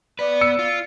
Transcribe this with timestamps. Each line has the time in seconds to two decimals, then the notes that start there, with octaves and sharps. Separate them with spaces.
0.19 B3 B4 D5
0.41 E6 C#7
0.59 F4